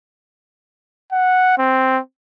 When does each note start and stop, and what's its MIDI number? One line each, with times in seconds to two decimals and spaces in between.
1.12 1.56 78
1.58 1.98 60